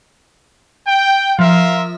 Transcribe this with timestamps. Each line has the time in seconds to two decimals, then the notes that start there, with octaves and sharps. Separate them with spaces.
0.87 G5
1.39 F3 A#4 E5 F5